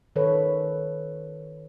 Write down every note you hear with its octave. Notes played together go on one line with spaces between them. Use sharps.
D#3 A4 B4 C#5